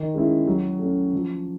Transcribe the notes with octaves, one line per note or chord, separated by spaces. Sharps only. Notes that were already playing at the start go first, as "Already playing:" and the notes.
Already playing: D#3
G#3 C#4 E4
F#3
A3 C#4
F3